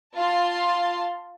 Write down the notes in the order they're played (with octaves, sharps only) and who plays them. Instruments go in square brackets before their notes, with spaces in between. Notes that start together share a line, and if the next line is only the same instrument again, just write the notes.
[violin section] F4 A5 C6